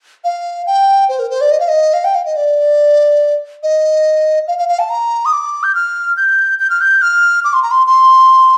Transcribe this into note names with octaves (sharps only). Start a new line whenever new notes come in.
F5
G5
C5
A#4
C5
D5
D#5
F5
D#5
F5
G5
F5
D#5
D5
D#5
F5
F5
F5
A5
A#5
D#6
D6
G6
F6
G6
G6
F6
G6
F6
D6
C6
A#5
C6
C6